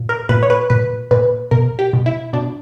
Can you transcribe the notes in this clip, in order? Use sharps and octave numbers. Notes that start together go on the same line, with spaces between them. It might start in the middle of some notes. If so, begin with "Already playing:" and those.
Already playing: A#2
A#4
A#2 B4
C#5
B4
A#2 B4
A#2 B4
B2 A#4
G4
B2
E4
B2 D4